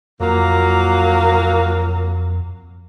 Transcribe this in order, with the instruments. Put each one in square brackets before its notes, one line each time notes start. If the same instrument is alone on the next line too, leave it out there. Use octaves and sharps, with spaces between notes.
[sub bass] F2 [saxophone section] A#2 F#3 A#3